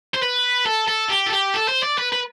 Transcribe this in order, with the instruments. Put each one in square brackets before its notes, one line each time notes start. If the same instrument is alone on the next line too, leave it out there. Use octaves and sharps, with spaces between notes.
[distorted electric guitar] C5
B4
A4
A4
G4
A4
G4
A4
C5
D5
B4
B4